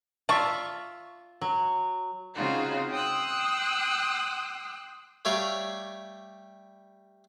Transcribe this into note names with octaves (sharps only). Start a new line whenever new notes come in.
F4 D5 E5 A5 C#6
F#3
C#3 C4 D#4 F4 F#4
G5 C6 D#6 E6 F#6
G3 A3 C#5 D5 F5